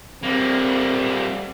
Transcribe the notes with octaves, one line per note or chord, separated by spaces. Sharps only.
G3 A#3 C4